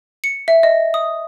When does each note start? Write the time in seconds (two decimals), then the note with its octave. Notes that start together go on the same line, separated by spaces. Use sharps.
0.24 C#7
0.48 E5
0.63 D#5
0.94 D#6